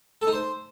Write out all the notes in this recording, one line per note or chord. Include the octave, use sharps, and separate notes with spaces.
A4
D#4
C5